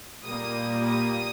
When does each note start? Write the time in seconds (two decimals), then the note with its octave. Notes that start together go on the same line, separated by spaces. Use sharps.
0.24 A#2 G3 A#3 D#6
0.86 D#6